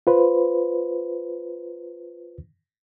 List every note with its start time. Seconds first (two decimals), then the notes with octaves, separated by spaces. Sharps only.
0.07 F4 B4 C5